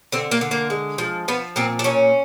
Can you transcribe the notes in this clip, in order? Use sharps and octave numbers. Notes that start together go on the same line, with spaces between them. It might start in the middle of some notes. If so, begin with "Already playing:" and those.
D3 C4
A#3
D3
A#3
G#3
F3
F3 B3
A#2 C4
D4
A#2 C#4